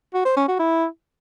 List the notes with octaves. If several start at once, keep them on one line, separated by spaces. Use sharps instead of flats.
F#4
C5
C#4
F#4
E4